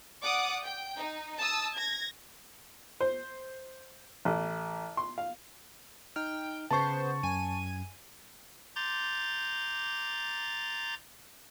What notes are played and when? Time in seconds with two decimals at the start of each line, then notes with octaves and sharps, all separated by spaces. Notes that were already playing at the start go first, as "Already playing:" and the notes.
0.24 D5 F#5 D6 D#6
0.64 G5
0.97 D#4
1.38 A5 D#6 E6
1.76 G#6 A#6
3.00 C5
4.25 A1
4.97 C6
5.18 F5
6.16 D#4 G5 F6
6.71 C#3 B3 C5 A5 C#6
7.23 F#2 G#5 D#7
8.76 A#5 C6 D6 G6 A6